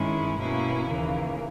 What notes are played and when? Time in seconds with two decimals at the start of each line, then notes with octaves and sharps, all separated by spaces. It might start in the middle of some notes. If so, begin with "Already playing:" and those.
Already playing: G2 D#3 G#3 C#4 E4
0.38 B2 A#3 C#4 E4
0.87 D#2 C#3 E3 A#3